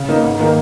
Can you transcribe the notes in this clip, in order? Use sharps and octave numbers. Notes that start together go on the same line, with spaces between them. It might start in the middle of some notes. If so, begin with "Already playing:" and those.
Already playing: C#3
A#3 D#4
G#2
D#3 A#3 D#4